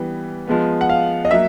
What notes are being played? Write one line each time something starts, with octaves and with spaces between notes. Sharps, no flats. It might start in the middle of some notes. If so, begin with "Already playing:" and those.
Already playing: E3 G3 B3
F3 G#3 B3
F#5
F5
D#5
F#3 A#3 E5